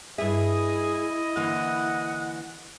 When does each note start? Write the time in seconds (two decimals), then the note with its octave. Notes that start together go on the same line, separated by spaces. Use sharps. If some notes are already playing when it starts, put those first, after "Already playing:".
0.18 G2 E4 G#4 D#5 E5
1.36 D3 E3 A#3 F#5